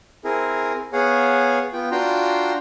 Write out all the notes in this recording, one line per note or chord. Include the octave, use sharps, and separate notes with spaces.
C4 E4 G#4 A#4
B3 G#4 C#5 F5 F#5
B3 F4 G5
D4 F4 F#4 G5 A#5 C6